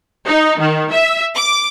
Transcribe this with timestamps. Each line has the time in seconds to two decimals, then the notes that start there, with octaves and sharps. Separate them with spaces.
0.25 D#4
0.58 D#3
0.91 E5
1.35 D6